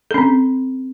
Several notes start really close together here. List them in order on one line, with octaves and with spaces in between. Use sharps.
A4 C#4 C4